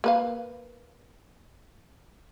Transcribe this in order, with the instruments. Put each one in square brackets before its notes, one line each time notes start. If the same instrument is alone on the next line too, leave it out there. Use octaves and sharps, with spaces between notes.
[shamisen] A#3 B4 F5